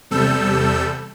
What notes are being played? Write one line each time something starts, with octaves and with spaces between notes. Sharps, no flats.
E2 C3 G3 A4 E6 G6